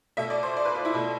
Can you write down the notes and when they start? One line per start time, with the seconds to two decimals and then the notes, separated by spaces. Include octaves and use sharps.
0.17 B2 A3 E5
0.30 D5
0.43 C5
0.57 D5
0.65 B4
0.75 F4
0.85 E4
0.94 B2 A3